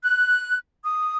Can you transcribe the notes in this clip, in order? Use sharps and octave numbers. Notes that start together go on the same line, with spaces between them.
F#6
D#6